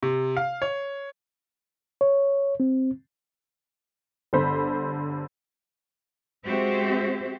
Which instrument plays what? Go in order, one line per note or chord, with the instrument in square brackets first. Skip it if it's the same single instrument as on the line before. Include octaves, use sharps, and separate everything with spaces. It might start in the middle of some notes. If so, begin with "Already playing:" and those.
[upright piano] C3
F5
C#5
[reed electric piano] C#5
C4
[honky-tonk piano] G1 D3 C5 B5
[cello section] G#3 C4 F#4 G4 C5 E5